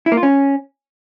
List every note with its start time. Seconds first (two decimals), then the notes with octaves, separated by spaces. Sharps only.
0.06 E4
0.12 A#3
0.17 F4
0.23 C#4